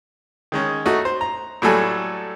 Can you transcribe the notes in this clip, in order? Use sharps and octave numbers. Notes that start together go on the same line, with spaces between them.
D#3 G#3 C#4
A3 D#4 F#4
C5
A#5
A2 F#3 G3 A4 G#5